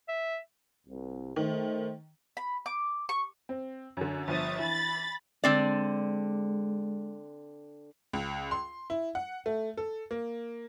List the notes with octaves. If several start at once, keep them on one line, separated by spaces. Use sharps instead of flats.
E5
C2
D#3 A3 C5
B5
D6
C#6
C4
F#2 D3
G1 F3 E5 D#6 A6 D#7
E3 B5 A6
D3 G#3 C4 D5
C#2
C6
E4
F#5
A3
A4
A#3